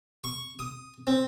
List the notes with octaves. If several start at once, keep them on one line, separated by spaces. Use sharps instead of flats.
C#6
D#6
C4